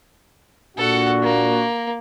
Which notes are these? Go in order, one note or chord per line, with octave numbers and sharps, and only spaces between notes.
A#2 D4 F#4 A4 F#5
A#3